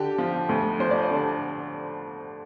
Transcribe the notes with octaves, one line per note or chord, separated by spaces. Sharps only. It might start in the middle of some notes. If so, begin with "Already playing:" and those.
Already playing: D3 G4
F3
D2
F3 C5
D5
C5
D3